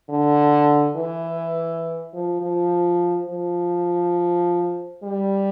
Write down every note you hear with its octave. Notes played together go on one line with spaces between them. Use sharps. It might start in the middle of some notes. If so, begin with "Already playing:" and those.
D3
E3
F3
F3
F3
G3